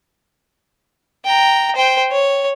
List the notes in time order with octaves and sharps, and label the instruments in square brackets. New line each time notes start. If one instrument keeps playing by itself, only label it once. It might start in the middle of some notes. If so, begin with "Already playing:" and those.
[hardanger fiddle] G5 A#5
C5 G5
C#5